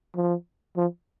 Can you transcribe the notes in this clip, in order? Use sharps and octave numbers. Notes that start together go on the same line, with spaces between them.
F3
F3